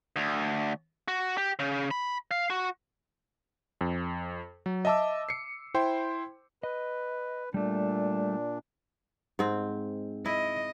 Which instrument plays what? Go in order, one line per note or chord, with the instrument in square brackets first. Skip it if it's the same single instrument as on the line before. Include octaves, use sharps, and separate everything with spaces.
[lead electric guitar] D2
F#4
G4
C#3
B5
F5
F#4
[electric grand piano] F2
F#3
D#5 E5 A5 D6 E6
C7 C#7
E4 C5 G5 C6
[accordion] B4 [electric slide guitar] D#5
[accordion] A#2 D4 [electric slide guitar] G3 A3
[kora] G#2 C4
[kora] E4 [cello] D#5